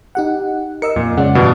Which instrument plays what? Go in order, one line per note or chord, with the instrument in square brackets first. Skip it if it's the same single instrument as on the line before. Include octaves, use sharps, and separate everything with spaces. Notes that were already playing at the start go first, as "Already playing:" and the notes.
[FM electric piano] D#4 G4 F#5
[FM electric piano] A#4 D#5 E6 [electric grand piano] C#7
[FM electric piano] F2 [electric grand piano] A#2
[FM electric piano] C#3 G#3 C#4 [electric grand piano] D5 F#5
[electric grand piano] G2 B2 E3